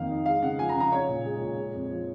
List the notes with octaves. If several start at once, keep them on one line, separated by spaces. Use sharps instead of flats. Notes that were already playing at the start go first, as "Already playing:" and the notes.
Already playing: F2 D#3 A#3 F5
D#4
G#3 F5
C#3 F#5
F3 G#5
A#5
C#3
A#5
C#4 C#5
A#2
G#3
A#2
G#3
F2
F3